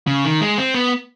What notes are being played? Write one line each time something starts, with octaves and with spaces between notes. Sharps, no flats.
C#3
D#3
G#3
C4
B3